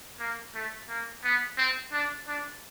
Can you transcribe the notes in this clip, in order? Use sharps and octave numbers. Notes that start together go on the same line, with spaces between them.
A#3
A3
A#3
B3
C4
D4
D4